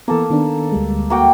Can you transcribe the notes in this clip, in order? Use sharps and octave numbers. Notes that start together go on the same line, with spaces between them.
E3 A#3 B3 A4
D#3 B3 D4
D2 G3 G#3
A#3 F#4 G5